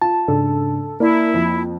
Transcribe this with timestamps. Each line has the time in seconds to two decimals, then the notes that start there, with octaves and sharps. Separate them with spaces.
0.02 F4 A5
0.28 G#2 C#3 D4 A4
1.00 A#3 E4 A#4 D5
1.34 F2